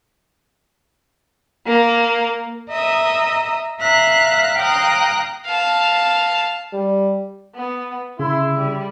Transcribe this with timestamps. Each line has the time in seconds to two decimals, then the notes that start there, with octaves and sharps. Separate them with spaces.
1.67 A#3
2.70 D#5 E5 A#5 D#6
3.80 E5 F5 A#5 F#6
4.58 F5 G5 A#5 D#6 F#6
5.47 F5 A5
6.73 G3
7.55 B3
8.19 C#3 E4 C6
8.56 G3